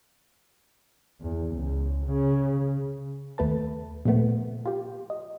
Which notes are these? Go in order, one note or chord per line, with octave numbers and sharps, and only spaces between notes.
E2
C#2
C#3
D#2 A3 B4 A5
A#2 F3 A3 B3
F4 G4
D#5